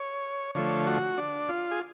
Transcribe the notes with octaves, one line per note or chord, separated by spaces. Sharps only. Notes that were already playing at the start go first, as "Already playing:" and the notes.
Already playing: C#5
D3 F3 A3 C#5
F#4
D4
F4
G#4